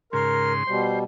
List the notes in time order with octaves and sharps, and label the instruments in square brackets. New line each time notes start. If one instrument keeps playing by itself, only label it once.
[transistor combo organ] G#2 C#3 [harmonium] A#4 [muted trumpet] C6
[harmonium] B2 G3 [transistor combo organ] C5